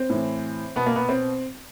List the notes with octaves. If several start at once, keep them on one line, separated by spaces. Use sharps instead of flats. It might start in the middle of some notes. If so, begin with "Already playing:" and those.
Already playing: C4
A2 E3
B2 B3
A#3
B3
C4